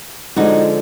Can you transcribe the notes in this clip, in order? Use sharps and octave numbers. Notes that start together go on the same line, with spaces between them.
D3 F3 G#3 D#4 F#4